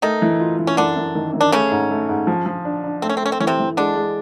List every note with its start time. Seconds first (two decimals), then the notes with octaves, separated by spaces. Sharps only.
0.02 D#3 A3 D#4
0.22 E3
0.40 F4
0.59 E3
0.67 C#4
0.77 F#2 D3 D4
0.96 F#2
1.15 D#3
1.34 F#2
1.41 D4
1.52 C#3 A3 C#4
1.72 G#2
1.91 A3
2.09 G#2
2.27 F3
2.46 F3
2.65 D4
2.84 D4
3.02 A3 C4
3.09 C#4
3.17 C4
3.22 A3 C#4
3.32 C4
3.40 E3 C#4
3.47 C3 C4
3.59 E3
3.77 D3 G#3 D4
3.96 G#3